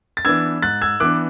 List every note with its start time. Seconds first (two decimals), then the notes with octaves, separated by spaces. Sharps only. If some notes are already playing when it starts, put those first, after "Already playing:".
0.17 A6
0.25 E3 B3 D4 E6 G#6
0.62 G#2 F#6 A6
0.81 E6 G#6
1.00 E3 B3 D4 D6 F#6